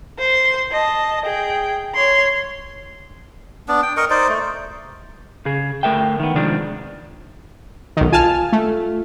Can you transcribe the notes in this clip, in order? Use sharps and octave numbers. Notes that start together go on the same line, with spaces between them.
C5 C6
D#5 A5
G#4 G5
C#5 C6
B3 D4
G5
A#4 D#5 C#6
D#4 C5 D5
A3
C#3 G#4
D2 A3 A#4 E5 G5
D#3 B3
C3 D#3 F3 G#3 D4
B1 D#3
F4 G#5 A5 F6
A3